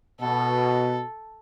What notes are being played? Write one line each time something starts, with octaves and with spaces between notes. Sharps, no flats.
B2 A4